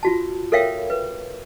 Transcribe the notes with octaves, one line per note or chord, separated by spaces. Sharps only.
F4 F#4 A5
A4 A#4 C#5 E5 F5 G5
B4